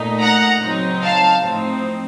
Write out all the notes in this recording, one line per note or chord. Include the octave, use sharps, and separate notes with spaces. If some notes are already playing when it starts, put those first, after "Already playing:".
Already playing: A#2 A3 D#4
F#5 A#5
C#3 F#3 C4 D#4
F5 A5
A2 F3 C4 D#4